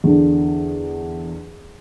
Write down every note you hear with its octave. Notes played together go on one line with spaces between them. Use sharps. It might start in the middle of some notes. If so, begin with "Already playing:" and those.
E2 D3 D4